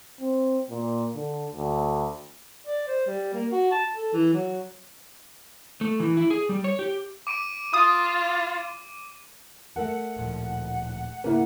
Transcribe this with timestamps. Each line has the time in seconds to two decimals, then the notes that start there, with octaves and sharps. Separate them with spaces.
0.21 C4
0.70 A#2
1.15 D3
1.51 D2
2.67 D5
2.88 C5
3.07 G3
3.34 A#3
3.52 F#4
3.72 A5
3.95 A4
4.13 E3
4.33 F#3
5.81 A3
6.00 E3
6.17 E4
6.30 G#4
6.49 G3
6.64 C#5
6.79 G4
7.27 D6 D7 D#7
7.74 F4 D#6
9.76 A3 A#4 F#5 A5
10.17 D1 A#2 F3
11.24 G#2 C#3 A#3 C#4 E4